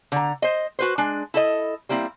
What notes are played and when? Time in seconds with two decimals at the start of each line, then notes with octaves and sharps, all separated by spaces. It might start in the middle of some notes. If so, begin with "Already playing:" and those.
0.12 D3 A#5
0.42 C5 D#5
0.79 F#4 B4 C5
0.98 G#3 D4
1.34 E4 A4 D#5
1.89 G3 A#3 C4 E4